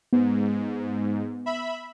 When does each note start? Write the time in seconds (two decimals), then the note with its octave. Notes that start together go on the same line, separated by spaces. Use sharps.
0.13 G#2 B3
1.46 E5 B5